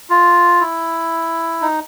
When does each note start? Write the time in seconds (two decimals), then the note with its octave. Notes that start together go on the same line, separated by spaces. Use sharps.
0.10 F4
0.61 E4
1.62 D#4